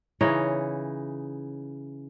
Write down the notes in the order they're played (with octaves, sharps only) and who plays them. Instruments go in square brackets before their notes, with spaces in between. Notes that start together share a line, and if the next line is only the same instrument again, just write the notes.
[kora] C#3 E3 D#4 C#5